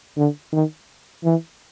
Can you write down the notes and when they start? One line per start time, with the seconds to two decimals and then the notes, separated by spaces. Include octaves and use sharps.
0.17 D3
0.52 D#3
1.24 E3